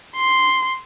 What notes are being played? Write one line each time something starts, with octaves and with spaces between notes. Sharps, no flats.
C6